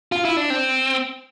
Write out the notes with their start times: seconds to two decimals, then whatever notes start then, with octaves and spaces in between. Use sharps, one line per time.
0.12 F4
0.25 E4
0.37 D4
0.50 C4